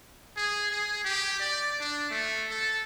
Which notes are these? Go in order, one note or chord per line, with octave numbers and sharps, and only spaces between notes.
G#4
G#4
G4
D5
D4
A3
A4